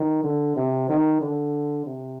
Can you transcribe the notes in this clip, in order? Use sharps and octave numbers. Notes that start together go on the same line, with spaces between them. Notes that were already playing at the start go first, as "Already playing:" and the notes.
Already playing: D#3
D3
C3
D#3
D3
C3